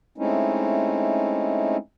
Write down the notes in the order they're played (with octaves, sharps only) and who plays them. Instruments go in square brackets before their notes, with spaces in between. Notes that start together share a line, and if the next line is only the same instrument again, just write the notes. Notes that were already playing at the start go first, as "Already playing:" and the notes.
[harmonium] G#3 A3 C4 C#4 D#4 E4